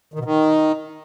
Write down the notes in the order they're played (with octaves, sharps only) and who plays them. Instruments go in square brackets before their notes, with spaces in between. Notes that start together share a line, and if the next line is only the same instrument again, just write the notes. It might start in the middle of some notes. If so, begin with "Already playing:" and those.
[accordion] D#3
B2
D#3